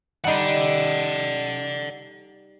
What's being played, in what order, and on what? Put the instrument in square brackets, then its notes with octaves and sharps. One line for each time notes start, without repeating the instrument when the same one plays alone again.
[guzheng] G3 D#4 C6 [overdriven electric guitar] D5 F#5